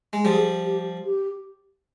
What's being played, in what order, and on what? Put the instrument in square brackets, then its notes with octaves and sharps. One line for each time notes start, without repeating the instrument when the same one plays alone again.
[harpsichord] G#3
[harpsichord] F3 G3 [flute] G#4
[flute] G4
G4